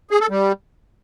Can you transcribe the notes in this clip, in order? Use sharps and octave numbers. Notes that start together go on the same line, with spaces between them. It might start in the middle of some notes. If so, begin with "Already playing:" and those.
G#4
A4
G3